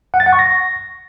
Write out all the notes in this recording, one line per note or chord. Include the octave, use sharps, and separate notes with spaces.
F#5
A6
F#5
C#6
A#6